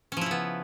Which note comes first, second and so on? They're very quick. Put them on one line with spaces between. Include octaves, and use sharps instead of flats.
C#4 F3 E4 C#3 B3